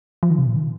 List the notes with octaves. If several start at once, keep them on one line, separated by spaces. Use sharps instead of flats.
F3
D#3
C3
A#2
D#3